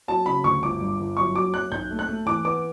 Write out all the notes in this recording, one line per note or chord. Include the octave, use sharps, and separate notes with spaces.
F#3 A5
C#3 B5
D2 C#6
G1 D6
G2
G1
F#2 C#6
F#3 D6
F#2 F#6
B1 G6
A3
F#6
A3
E3 D6
B3 D6